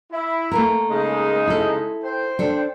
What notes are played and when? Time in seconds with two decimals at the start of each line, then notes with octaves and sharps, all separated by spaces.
0.12 E4
0.51 A3 A#3 A#4
0.90 C#3 G#3 D#4
1.47 E4 A4
2.03 C5 G5
2.39 D4 A4